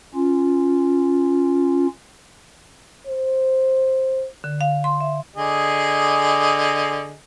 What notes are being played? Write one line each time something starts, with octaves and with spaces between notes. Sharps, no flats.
C#4 F4
C5
D3
F5
C6
E5
D3 G#4 D#5